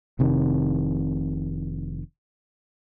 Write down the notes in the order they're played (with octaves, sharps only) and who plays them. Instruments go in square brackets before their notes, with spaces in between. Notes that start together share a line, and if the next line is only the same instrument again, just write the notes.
[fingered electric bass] F1 C3 D#3